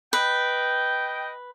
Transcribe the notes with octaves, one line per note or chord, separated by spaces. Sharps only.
B4 D#5 G5